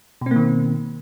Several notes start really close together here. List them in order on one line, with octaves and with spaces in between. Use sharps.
B2 C4 A#3 D#3